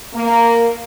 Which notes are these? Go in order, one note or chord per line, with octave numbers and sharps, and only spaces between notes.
A#3